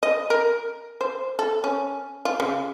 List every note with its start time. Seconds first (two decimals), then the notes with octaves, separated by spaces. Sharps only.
0.03 D#5
0.30 A#4
1.01 C5
1.39 A4
1.64 C#4
2.25 F4
2.40 C#3